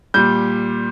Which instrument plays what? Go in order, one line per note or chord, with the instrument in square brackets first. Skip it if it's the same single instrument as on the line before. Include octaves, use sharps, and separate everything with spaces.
[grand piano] A#2 G3 G6